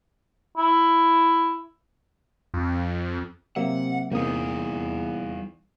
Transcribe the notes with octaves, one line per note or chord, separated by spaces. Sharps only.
E4
F2
C3 F#3 A#3 E5 F#5
E2 C3 G3 A#3 D#4 D#6